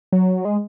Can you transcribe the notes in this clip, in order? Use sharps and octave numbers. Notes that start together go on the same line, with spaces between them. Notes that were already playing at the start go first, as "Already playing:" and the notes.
F#3
G#3